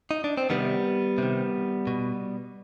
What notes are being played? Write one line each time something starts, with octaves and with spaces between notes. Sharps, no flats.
D#4
D4
C4
C3 D#3 G3 B3
C3 D#3
B2